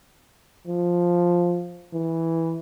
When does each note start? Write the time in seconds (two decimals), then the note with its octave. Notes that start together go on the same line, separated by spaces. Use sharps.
0.67 F3
1.93 E3